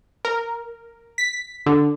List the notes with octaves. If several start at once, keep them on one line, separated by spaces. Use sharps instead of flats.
A#4
B6
D3